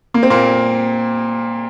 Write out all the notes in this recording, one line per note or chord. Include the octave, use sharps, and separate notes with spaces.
A#3
C4
A#2 A#3